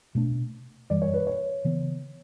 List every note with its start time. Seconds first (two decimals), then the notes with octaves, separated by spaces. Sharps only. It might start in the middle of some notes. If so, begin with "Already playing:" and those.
0.15 B2 A3 D4
0.90 F#2 E3 G3 D5
1.02 C#5
1.14 B4
1.27 C#5
1.65 C#3 E3 B3